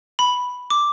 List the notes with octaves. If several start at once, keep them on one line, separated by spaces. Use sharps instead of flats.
B5
D6